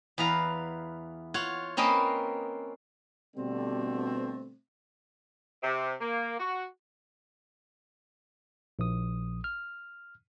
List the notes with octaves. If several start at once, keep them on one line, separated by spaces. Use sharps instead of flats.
E2 B4 F5 A#5
F4 C#5 F#5
A#3 C4 C#4 B4 D#5
B2 D3 G3 A3 C4
C3
A#3
F#4
A#1 D#6
F6